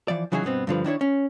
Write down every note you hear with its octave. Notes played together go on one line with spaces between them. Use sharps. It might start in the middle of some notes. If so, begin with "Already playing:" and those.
E3 F3 D5
C#3 E3 F#3 D#4 F#4 G#4
G2 B2 B3 C4
G2 D3 F3 B4
D#3 D4 E4 C#5
C#4